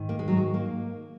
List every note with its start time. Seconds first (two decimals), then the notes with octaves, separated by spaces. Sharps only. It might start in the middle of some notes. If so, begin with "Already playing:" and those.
Already playing: G#2 D#3
0.09 A#3
0.19 G#3
0.28 F#3
0.37 G#3
0.54 A#3